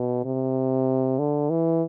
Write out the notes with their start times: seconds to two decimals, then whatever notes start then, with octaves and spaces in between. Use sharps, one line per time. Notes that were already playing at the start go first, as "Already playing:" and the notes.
Already playing: B2
0.25 C3
1.19 D3
1.50 E3